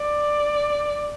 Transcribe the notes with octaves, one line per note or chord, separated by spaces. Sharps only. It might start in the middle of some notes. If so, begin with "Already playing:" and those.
Already playing: D5